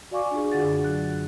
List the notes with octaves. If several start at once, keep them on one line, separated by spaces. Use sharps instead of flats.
F#4 D5 F5 G#5 C#6 D6
D4 F4 G#4
D3 F#4 G#4 F#5 A6
F#2
F#3 F#6